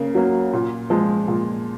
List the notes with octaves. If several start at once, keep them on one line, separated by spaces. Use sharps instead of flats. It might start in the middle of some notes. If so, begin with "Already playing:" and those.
Already playing: C#3 A#3
F#3 A#3
A#2
F3 G#3
A#2